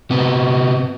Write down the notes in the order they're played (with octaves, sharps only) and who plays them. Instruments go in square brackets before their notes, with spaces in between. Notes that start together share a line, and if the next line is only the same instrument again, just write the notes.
[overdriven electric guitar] C3 B3